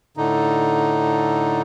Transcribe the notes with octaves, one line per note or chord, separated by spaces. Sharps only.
A2 D3 D#4